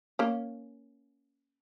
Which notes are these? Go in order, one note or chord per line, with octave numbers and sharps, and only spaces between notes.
A#3 C#4